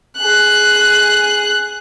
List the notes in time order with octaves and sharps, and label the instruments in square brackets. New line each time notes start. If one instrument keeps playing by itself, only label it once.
[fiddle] G#4 F#6